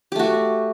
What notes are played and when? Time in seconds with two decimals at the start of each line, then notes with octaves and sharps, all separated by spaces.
0.12 G4
0.16 A3
0.19 F#4